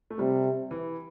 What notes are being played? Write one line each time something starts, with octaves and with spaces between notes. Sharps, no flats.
A3
C3 G3
E3